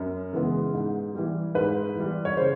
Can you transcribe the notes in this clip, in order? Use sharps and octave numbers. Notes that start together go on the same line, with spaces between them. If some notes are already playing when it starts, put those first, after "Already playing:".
Already playing: F#2
C#3 E3 G#3 B3
G#2
E3 G3
G#2 B4
E3 G3
C#5
C#3 C5